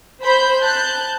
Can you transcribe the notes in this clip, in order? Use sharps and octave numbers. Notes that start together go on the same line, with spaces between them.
C5 B5 G6
A5 F#6 G6